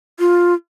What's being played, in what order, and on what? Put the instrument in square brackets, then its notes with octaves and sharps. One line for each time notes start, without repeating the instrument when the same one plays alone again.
[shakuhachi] F4